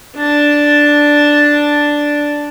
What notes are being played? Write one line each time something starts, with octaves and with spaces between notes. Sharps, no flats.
D4 A5